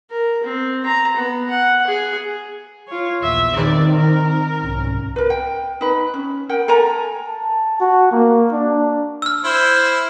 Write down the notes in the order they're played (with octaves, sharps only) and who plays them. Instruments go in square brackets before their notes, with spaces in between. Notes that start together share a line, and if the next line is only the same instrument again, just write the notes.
[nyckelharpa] A#4
C4
A#5
B3
F#5
G#4
[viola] F4 C#5
[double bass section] A#1 E2 [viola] E5
[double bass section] D#3 C4 [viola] D5
[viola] A#4
[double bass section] C2 G#2 C#4
[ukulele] A#4 B4
G5
D#4 B4
C#4
A#4 F#5 G5
A4 A#4 G#5 A#5
[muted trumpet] A5
F#4
A#3
D4
[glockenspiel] E6 F6
[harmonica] E4 C5